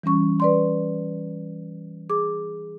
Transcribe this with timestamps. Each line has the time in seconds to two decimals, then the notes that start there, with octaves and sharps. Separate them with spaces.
0.03 E3 G3 C#4 C#6
0.40 B4 D5 C6
2.10 G#4 D6